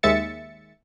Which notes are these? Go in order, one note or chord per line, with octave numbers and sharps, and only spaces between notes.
D#2 G#3 E5 A6 C#7